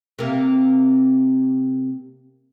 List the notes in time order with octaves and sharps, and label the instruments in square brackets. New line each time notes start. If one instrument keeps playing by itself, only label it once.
[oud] C3 A#3